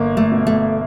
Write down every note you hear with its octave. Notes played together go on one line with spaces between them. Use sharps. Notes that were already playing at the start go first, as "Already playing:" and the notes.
Already playing: G1 A#3
A3
B2
A3